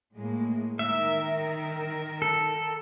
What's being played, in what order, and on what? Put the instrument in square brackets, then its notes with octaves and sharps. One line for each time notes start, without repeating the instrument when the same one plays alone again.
[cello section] A2 G#3 A#3
[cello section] D#3 A#4 [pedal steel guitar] E5
[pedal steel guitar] A4